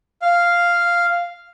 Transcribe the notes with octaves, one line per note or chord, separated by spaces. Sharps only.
F5